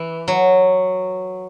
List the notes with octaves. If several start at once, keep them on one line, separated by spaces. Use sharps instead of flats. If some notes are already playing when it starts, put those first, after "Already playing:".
Already playing: E3
F#3